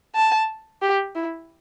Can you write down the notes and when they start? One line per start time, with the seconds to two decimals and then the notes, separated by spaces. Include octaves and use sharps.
0.15 A5
0.82 G4
1.15 E4